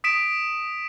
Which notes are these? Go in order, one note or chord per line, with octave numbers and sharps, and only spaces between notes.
D#6 B6 D7 E7